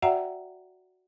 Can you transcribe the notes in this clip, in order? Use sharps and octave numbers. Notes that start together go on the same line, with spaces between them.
F#4 D5 E5 F#5 G5 A#5